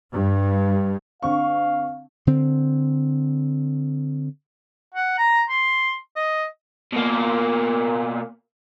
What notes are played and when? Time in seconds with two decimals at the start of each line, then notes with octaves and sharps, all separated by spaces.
0.12 G2
1.23 D3 C4 F5 C#6
2.27 D3 C4
4.95 F#5
5.18 A#5
5.49 C6
6.16 D#5
6.92 B2 A#3